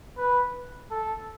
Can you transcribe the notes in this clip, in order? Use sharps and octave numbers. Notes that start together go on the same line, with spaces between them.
B4
A4